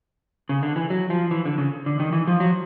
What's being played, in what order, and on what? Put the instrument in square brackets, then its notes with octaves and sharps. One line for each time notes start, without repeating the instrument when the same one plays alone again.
[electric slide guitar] C#3
D3
E3
F#3
F3
E3
D3
C#3
D3
D#3
E3
F3
F#3